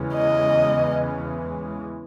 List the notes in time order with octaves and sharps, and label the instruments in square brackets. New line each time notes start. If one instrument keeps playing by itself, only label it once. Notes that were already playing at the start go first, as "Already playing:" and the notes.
Already playing: [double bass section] E2 C#3 E3 G#3 C#4
[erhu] D#5